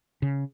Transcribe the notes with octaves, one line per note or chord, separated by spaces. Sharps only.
C#3